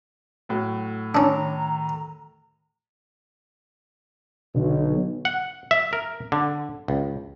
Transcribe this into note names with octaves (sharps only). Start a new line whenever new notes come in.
A2 F#3
D#3 C#4 D4 A#5
B1 B2 D3
F#5
E5
A#4
D3
C#2